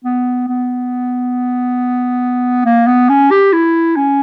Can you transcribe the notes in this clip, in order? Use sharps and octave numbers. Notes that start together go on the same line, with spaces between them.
B3
B3
A#3
B3
C#4
G4
E4
C#4